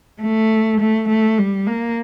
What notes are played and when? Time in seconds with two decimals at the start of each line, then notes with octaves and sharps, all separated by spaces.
0.22 A3
0.80 A3
1.09 A3
1.38 G3
1.67 A#3